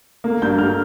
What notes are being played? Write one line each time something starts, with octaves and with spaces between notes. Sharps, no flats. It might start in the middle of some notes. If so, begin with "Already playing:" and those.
A#3
G2 G6
G2 F6